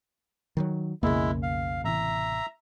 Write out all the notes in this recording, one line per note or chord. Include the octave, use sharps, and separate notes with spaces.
D#3 F3 F#3
B1 F2 C#3 G#3 A#3 B3 E4
F5
A1 C3 E3 E5 A#5